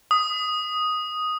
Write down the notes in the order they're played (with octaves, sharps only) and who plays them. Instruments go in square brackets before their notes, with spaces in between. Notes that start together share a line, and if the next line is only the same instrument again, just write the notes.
[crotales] D#6